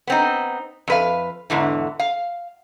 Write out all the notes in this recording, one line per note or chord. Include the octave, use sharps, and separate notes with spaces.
B3 C4 D#4
F2 B4 F5
E2 G#2 D3 E3
F5